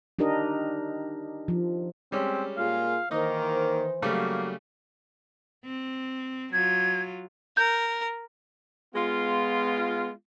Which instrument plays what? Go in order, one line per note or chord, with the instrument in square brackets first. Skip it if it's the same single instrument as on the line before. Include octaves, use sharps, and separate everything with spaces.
[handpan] D4 D#4 G4 A#4 D#5
F3
[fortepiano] G3 G#3 C#4 [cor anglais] C4
[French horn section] A#2 A#3 G#4 [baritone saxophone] F4 [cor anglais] F5
[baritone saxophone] D#3 [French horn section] E3 C5 [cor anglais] A#3 [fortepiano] D#4 D#5
[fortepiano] C#3 G3 A3 [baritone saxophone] F#3 [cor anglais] A#3
[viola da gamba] C4
[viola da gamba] F#3 F4 [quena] G#6
[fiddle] A#4 [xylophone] G6
[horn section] G#3 B3 F4